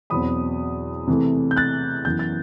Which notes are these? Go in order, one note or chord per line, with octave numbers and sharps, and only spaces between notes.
E2 B2 F#3 C4 B5 D#6
C3 E3 A3
G6
F#6 A6
F#2 E3 B3 G6
A6